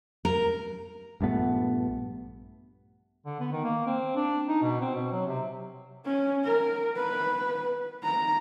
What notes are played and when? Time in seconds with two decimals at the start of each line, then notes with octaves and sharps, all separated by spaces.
0.25 A#4
1.21 A#1 G2 A3 B3
3.26 D3
3.40 B3
3.52 D#3
3.65 A#3
3.87 C4
4.16 D4
4.48 D#4
4.62 B2
4.81 C4
4.95 B2
5.12 F#3
5.26 C3
6.05 C#4
6.44 A#4
6.96 B4
8.03 A#5